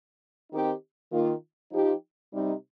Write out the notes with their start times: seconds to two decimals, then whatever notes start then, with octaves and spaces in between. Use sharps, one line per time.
0.51 D#3 C4 D#4 G4
1.11 D#3 A#3 F4
1.71 F3 D#4 G4
2.31 C3 G3 D#4